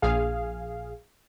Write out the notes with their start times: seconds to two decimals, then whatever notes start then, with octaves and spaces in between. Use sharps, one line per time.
0.02 A#1 G#4 F5